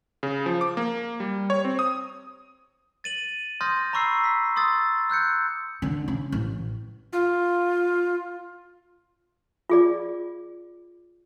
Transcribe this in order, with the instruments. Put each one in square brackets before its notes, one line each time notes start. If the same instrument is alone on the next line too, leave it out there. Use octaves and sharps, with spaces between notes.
[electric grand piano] C#3
F3
D6
A#3
G3
C#5
C4
D#6
[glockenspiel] A6 D#7 F#7
C6 D#6 F6 G6 A6 A#6
A#5 B5 C#6 E6 C7
E6 B6
C6 D#6 E6 A6
E6 F#6 G6 C#7
[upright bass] D3
C#3
A1
[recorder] F4
[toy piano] F4 G#4 D5